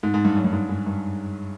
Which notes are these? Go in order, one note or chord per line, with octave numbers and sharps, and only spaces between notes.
G#2
G#2
G2
F#2
G2
G#2
G#2
G2